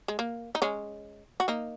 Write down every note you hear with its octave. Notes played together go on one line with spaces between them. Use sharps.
G#3
A#3
D#4
G#3 C#4
F#4
A#3 D#4